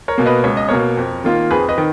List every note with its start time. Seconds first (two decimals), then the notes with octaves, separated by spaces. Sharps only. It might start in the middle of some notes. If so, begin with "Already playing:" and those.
0.08 A#4 C#5
0.18 B2 A#3
0.26 B4 D#5
0.44 C#2 C#5
0.57 D#5
0.69 B2 A#3 A#4 C#5
0.97 F2
1.24 D#3 A#3 F4
1.50 F2 G#4 B4
1.69 B4 D#5
1.78 D#3